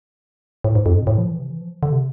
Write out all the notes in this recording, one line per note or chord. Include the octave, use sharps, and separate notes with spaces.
A2
G#2
F2
G#2
B2
A2
F3
E3
C3
E3
F3
D3
C3